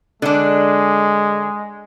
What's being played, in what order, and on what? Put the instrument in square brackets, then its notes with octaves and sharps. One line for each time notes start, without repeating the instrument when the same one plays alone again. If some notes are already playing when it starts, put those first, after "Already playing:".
[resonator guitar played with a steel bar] D3 D4 [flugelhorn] G#3